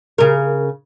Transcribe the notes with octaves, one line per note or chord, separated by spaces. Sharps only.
C#3 A#4